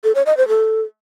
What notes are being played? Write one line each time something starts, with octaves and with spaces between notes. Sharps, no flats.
A4
C#5
D#5
C5
A4